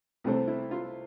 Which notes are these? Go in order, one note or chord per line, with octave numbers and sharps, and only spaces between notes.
C2 C3 E3 A3 C4
E4
F4